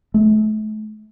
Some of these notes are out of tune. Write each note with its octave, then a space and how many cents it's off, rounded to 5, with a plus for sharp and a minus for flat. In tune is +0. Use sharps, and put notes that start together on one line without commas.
A3 -35